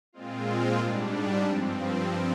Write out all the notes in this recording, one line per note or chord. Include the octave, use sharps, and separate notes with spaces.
A#2 G#3 C4 F4
G#2 G3 D4
G2 F3 C4